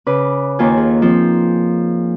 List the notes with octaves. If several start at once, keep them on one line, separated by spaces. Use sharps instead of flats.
C#3 B4 D6
D#2 D#3 A#3 D#4 F4 G#5
G#4
F3 C4